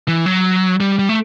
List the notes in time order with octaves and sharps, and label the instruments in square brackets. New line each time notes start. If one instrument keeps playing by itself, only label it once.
[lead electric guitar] E3
F#3
G3
G3
A3